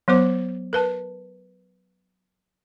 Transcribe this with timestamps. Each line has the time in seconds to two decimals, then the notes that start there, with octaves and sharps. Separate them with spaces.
0.08 F#3 B3 C5 D6
0.73 A#4 B4 A5